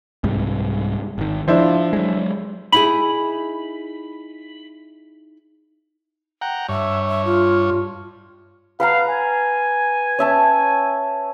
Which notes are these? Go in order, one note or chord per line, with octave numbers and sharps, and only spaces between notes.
C2 G#2 G3
G#1 D#3
F3 D4 E4 C5
F#3 G#3
D#4 E4 G#4 B5
F#5 G5 A#5
G2 C#5 E5
E5
F4
B4 F5 F#5 A#5
G#5
C#4 E5 A5